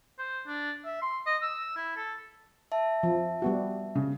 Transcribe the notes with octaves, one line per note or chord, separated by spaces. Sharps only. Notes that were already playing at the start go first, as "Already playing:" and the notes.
C5
D4
E5
C6
D#5
E6
E4
A4
E5 A5
F3
G3 B3 F#4
C#3